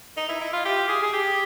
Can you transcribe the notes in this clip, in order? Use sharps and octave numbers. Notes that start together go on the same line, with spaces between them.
D#4
E4
E4
F4
G4
G#4
G#4
G4